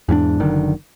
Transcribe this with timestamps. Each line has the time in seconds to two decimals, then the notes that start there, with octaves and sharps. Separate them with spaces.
0.09 E2 G#2 C#4 D4
0.40 F#1 D3 D#3